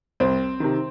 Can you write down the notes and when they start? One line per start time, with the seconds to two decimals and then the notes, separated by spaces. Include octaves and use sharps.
0.20 C2 C4
0.60 C3 D#3